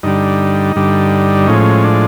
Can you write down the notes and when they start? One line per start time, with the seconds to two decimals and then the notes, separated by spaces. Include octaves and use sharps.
0.03 G2 D3 G3 D#4
0.76 G2 D3 G3
1.47 A2 F3 G#3 C#4
1.84 D4